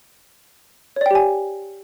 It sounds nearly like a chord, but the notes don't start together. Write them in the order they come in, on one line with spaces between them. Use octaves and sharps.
C#5 D5 G5 G4 G#5